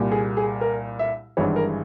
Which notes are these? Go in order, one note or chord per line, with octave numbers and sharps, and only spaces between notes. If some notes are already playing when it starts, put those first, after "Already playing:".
Already playing: C2 A#2 G3
G#4
G#4
A#4
E5
G#1 G2 E3 G#3 C#5
A#4